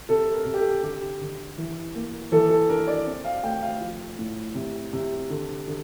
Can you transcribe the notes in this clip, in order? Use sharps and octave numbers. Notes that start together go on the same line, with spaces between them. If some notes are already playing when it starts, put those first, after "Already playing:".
C3 A4
A#4
C3
G4
A4
D3 G4
D3
E3
A#3
E3 A4
A4
D4 A#4
D5
C4
F5
A3 G5
F5
F3
A2
C3
C3
D3
D3